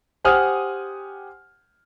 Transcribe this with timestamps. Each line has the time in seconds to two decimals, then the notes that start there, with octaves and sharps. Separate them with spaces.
0.24 G4 C5 F#5 G#5 D#6 F6